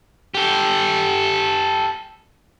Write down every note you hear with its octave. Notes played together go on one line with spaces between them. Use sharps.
G4 A4